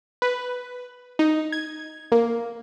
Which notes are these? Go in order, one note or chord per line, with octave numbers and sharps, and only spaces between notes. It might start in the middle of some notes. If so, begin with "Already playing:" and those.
B4
D#4
G#6
A#3